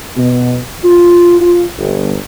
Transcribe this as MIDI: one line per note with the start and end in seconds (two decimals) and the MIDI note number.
0.17 0.58 47
0.84 1.38 65
1.41 1.68 65
1.79 2.16 31